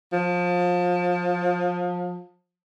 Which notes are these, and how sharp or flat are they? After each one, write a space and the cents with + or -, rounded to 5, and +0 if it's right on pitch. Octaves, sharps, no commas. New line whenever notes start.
F3 +25